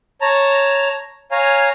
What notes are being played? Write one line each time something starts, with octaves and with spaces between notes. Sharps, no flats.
C#5 A5 A#5
C#5 F5 G#5 A#5